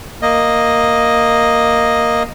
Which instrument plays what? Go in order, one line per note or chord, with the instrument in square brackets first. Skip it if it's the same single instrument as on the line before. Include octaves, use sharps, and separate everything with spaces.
[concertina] A#3 D#5